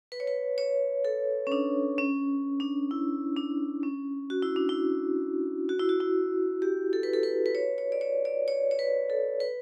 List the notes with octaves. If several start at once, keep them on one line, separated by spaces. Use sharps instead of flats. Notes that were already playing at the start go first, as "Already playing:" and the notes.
B4
C#5
B4
C#5
A4
C#4
D4
C#4
D4
E4
D4
C#4
F#4
E4
D4
E4
F#4
E4
F#4
E4
G4
A4
B4
A4
B4
B4
C#5
C#5
D5
C#5
D5
C#5
C#5
B4
A4
B4